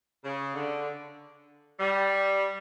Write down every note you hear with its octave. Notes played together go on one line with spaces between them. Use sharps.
C#3
D3
G3